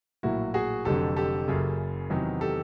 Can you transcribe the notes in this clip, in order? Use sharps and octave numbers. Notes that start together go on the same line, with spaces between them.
A#1 A2 F#3 A#3 E4 F#4
F#4 G#4
F1 F2 D3 F#3 G4 A4
G4 A4
F#1 F#2 C#3
E2 C3 D#3 F#3
G4 A4